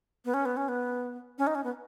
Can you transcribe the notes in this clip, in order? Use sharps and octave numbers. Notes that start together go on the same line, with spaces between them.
B3
C#4
B3
C#4
B3
C#4
D#4
C#4
B3